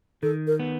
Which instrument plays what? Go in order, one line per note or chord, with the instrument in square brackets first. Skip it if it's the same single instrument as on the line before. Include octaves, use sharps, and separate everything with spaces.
[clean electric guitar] D#3 [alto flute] A4
[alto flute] A#4
[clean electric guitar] B3